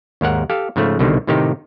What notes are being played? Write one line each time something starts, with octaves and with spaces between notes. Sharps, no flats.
D#2 G#2 A#4 F#5
G4 A4 F5
G#2 C#3 F3 A3
C2 B2 D3 D#3 G3
A2 C3 D#3 D#4 G4